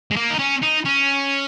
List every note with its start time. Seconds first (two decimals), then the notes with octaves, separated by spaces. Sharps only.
0.11 G#3
0.16 A#3
0.30 D#4
0.39 C#4
0.63 D#4
0.86 C#4